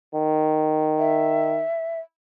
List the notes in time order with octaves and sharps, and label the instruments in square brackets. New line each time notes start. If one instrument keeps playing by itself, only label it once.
[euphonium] D#3
[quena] E5